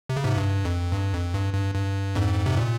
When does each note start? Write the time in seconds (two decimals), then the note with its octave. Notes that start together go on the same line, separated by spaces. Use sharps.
0.09 C3
0.16 C#3
0.24 G#2 C3
0.37 G2
0.65 F2
0.92 G2
1.13 F2
1.34 G2
1.54 G2
1.75 G2
2.15 F2 G#2
2.46 C3
2.57 A#2